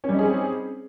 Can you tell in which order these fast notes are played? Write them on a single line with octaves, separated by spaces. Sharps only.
C#4 G3 D#4 G#4 C4